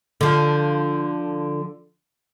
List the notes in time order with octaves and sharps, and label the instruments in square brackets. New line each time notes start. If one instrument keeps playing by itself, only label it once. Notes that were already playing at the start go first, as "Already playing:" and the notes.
[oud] D3 F3